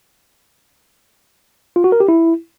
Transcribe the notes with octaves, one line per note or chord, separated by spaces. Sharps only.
F4
F#4
A#4
G4
E4